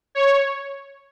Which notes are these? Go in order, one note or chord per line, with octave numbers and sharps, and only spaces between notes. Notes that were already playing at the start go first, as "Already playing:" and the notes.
C#5